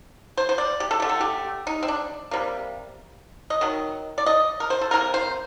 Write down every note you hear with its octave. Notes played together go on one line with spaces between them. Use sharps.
C5
C5
D5
G4
A4
D3 A3 G4
A4
G4
D#4
C4
D4
C3 G3 A#3
D#5
D#3 F#3
D5
D#5
A#4
C5
A4
C3 F#3 A#3 A#4
C5